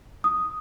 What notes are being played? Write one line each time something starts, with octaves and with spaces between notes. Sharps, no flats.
D#6